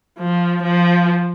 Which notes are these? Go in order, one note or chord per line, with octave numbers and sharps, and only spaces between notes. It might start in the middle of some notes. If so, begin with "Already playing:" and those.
F3
F3